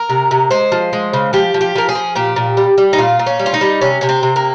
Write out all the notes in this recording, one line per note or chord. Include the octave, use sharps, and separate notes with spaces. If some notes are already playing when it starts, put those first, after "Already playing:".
Already playing: A#4
C3
C3
G#3 C5
F3
G#3
C#3
F3 G4
F3
G4
F3 A#4
G#4
F3
A#2 G4
A#2
G3
G3
D#4
A#2 F4
A#2
C#4
G3
F4
D#4
G3
C3 C#4
C3 C#4
C4
C3
A#3